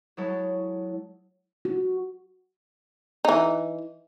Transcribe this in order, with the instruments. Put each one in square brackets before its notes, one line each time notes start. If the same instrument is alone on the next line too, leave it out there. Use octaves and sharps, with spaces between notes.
[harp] F#3 G#3 E4 A4 C#5
[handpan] F#4
[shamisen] E3 D#4